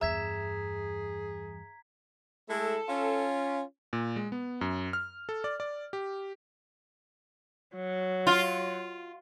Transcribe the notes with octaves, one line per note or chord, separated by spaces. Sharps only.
E2 G2 G#4 E5 A#5 G#6 B6
G#3 A3 E4 A4
C#4 F4
A#2
G#3
B3
F#2
F6
A4
D5
D5
G4
F#3
F4